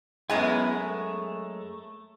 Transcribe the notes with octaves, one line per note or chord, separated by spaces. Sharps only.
F#2 G#3 B3 E4 G#5
A3